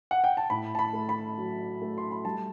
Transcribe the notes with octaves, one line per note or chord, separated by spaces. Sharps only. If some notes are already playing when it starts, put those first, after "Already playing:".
F#5
G5
A5
A2 B5
A5
B5
A3
B5
F#3
A3
C6
B5
G3 A5